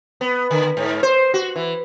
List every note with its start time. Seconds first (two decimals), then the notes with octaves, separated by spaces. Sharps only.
0.21 B3
0.51 D3
0.77 G#2
1.03 C5
1.34 F#4
1.56 E3